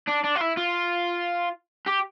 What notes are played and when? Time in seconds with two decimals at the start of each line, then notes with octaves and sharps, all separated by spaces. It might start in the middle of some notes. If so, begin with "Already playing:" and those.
0.08 D4
0.24 D4
0.36 F4
0.41 E4
0.57 F4
1.87 G4